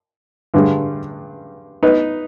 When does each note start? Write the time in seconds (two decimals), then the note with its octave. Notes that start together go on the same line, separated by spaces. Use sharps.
0.54 G2 D3 G3 D4 G#4
1.83 B3 D#4 B4